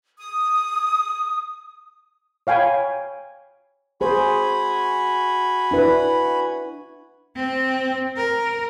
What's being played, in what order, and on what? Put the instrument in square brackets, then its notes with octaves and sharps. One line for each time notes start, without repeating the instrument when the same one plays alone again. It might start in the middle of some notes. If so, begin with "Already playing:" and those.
[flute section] D#6
[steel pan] C#5 F5 G5 G#5 B5 C#6
[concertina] F#4 G#5 B5 [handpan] G#4 C5
[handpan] D4 E4 B4
[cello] C4
A#4